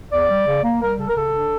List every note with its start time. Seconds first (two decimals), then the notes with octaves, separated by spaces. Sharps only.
0.11 E2 D5
0.29 G3
0.46 C#3
0.63 A#3
0.81 G3 A#4
0.98 C#3 A4
1.08 A#4
1.16 C#3 A4
1.33 D4